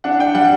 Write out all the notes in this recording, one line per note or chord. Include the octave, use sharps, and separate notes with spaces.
D4 F#5
D4 G5
G3 F#5